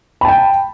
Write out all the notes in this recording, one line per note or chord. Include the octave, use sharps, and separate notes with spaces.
G5 A5 B5